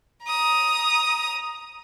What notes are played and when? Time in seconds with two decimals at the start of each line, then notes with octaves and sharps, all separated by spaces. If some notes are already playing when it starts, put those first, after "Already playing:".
0.24 A#5 D#6